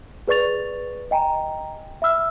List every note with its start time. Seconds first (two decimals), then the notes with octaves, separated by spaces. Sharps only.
0.28 G#4 B4 D5 C#6 A6 F7
1.11 D#5 G5 G#5 A#5
2.02 E5 B5 E6 F6